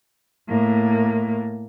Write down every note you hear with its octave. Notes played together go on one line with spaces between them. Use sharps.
A2 A#3